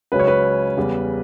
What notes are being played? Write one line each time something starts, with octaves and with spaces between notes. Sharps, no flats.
C#2 C#3 F#3 C#4 B4
C#5
B4
E2 C#3 G3 C#4